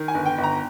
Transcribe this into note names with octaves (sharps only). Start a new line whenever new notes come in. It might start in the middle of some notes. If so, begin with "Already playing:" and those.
Already playing: D#3
G#5
G1
G5
G1
A#5